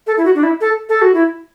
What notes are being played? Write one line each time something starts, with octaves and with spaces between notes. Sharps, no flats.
A4
E4
F#4
D4
E4
A4
A4
F#4
E4